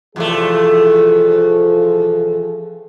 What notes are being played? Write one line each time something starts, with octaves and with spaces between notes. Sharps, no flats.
E2 C3 F3 A3 G#4